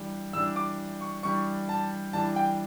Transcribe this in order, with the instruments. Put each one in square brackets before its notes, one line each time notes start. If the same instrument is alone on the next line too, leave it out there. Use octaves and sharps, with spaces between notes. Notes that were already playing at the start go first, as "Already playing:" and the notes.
Already playing: [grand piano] E3 G3 D4
E3 G3 D4 E6
D6
C#6
E3 G3 D4 C#6
A5
E3 G3 D4 A5
G5